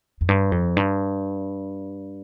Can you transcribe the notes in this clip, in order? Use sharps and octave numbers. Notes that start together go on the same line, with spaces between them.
F2
G2
F2
G2